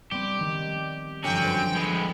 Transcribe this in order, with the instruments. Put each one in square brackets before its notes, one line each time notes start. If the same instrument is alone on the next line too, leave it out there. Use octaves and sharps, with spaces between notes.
[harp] G3 B3 C4 [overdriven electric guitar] G4
[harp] D#3 G3
[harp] G1 F3 [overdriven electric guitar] F#3 C#4 [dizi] G5
[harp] B4 C5
[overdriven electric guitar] G#3 B3 [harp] G4